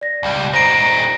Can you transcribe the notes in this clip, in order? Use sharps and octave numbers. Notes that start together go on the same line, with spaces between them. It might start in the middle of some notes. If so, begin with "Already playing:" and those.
D5 A#6
C#2 G3
G3 D#4 C5 A#6 C7 D7